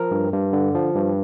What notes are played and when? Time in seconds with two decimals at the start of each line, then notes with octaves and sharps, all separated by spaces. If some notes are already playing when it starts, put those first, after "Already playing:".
Already playing: F3 A#4
0.11 G2
0.32 G2
0.53 D3
0.75 F3
0.95 G2